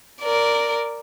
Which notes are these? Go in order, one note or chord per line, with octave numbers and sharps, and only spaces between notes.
A#4 D5